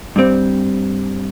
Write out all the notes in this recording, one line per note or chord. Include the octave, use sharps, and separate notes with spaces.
G2 G3 C4